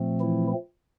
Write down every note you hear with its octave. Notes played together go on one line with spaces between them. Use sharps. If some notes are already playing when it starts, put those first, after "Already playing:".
Already playing: A#2 F3 A3 C4
E3 E4